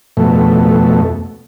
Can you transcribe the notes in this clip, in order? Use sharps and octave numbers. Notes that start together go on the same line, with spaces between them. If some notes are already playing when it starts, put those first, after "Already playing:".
F2 B2 A3